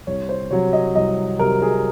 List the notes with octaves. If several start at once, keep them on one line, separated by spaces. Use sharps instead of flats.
C2 C#5
C5
C3 F#3 C#5
D#5
C2 D#5
C3 F#3 A#4
G#4